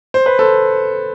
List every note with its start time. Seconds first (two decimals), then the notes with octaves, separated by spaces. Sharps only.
0.14 C5
0.26 B4
0.39 A4 C5